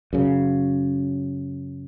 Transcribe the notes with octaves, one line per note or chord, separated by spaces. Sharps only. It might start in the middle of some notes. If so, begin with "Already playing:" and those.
F#2 C#3